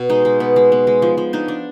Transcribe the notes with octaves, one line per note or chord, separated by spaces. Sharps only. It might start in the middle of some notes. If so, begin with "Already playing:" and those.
Already playing: B2
G#3 D#4
G#3
B3
G#3
B3
G#3
F3
F3
D4 D#4
D4